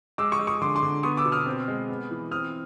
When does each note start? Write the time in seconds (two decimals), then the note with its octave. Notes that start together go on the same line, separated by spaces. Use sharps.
0.18 G#3 D6 E6
0.32 C#6 D#6
0.39 G#3
0.47 C#6 D#6
0.62 D3 C6 D6
0.76 C6 D6
0.83 D3
1.03 B3 C#6 D#6
1.17 D6 E6
1.25 B2
1.32 D#6 F6
1.46 C4
1.68 G#3
1.89 B3
2.11 E3
2.31 C4 D#6 F6